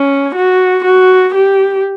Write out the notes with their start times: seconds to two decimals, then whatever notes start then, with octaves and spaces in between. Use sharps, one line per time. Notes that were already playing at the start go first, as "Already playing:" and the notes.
Already playing: C#4
0.35 F#4
0.85 F#4
1.35 G4